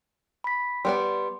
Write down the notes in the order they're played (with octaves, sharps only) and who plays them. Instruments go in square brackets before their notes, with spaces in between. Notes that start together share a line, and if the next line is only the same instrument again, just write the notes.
[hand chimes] B5 B6
[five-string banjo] G3 B3 D5 [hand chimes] C6